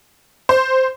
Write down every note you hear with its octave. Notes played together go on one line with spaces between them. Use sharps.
C5